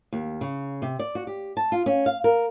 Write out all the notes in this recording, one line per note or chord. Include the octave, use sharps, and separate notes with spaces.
D#2
C#3
C3
D5
F#4
G4
A5
F4
C#4
F5
A#4